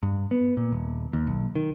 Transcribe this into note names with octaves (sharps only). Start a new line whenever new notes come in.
G2
B3
A#2
D#1
D#2
B1
D#3